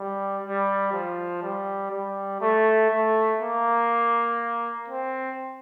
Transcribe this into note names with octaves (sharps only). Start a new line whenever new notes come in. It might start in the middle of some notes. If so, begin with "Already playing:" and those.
Already playing: G3
G3
F3
G3
G3
A3
A3
A#3
C4